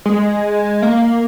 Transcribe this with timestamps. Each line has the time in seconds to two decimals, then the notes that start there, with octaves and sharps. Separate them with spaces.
0.05 G#3
0.82 A#3